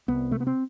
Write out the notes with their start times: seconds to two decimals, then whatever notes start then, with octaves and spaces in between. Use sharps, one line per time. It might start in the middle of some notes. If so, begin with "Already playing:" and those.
0.08 C2 B3
0.31 C3 A3
0.40 B3
0.47 C4